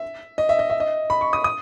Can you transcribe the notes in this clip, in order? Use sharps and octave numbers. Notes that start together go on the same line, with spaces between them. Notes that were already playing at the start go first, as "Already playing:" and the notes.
Already playing: E5
D#5
E5
D#5
E5
D#5
B5
C#6
D#6
D#6